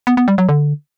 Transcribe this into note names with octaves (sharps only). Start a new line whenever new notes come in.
B3
B3
G3
F#3
D3